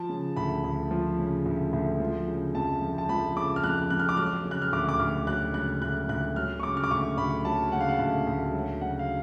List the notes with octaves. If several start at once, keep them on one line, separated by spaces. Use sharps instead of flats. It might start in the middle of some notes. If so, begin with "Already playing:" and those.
Already playing: F3 A5
C#3
D2 B5
D2
F3
C#3
D2
D2
F3
C#3
F2 A5
F2
A5
F3 B5
C#3 D6
F6
F2 F#6
F2 F#6
F6
D6
F#3 F6
C#3
F#6
F6
D2 D6
D6
D2 F6
F#3 F#6
C#3 F#6
D2 F#6
D2 F#6
F#3 F6
C#6
C#3 D6
F6
D6
D2 C#6
D2 B5
F#3 A5
C#3 F#5
F5
F#5
D2
D2
F#3
C#3 F#5
F5